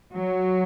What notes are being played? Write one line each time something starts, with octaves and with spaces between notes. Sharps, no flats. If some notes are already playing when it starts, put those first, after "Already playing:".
F#3